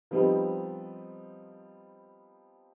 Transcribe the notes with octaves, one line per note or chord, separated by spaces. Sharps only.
F3 G3 B3 C4 D#4